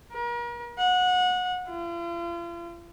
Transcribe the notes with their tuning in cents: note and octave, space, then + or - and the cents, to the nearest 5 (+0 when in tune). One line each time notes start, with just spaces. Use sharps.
A#4 +40
F#5 -25
F4 -40